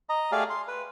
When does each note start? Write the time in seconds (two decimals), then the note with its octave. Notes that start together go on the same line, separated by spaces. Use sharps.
0.09 D#5 A#5
0.32 A3 G4 G#4 D5 F5
0.50 C6
0.68 B4